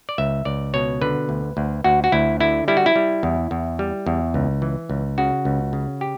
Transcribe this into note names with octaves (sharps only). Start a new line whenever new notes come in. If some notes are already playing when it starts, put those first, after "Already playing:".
D5
C#2 E5
C#2 D5
B2 C#5
D3 B4
D2
D2
D2 F#4
F#4
D2 E4
D3 E4
G3 E4
F#4
E4
G3
E2
E2
G3
E2
C#2
E3
C#2
C#3 F#4
C#2
C#3
G4